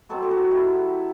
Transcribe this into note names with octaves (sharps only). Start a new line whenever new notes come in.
B2 F#3 C4 F#4 A4
G4
F#4 A4
E4 G4